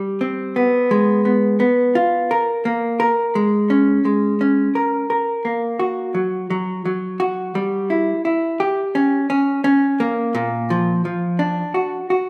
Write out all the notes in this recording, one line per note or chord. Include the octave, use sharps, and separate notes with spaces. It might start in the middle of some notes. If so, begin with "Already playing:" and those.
Already playing: G3
C4
B3
G#3
B3
B3
F4
A#4
A#3
A#4
G#3
C#4
G#3
C#4
A#4
A#4
A#3
F#4
F#3
F#3
F#3
F#4
G3
E4
E4
G4
C#4
C#4
C#4
A#3
A#2
F3
F3
D4
F#4
F#4